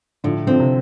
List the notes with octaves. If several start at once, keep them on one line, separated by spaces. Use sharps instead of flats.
A2 D3 F3
D3 F3 C4
C3